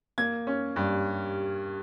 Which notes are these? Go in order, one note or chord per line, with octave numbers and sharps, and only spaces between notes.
A#3 G#6
C#4
G2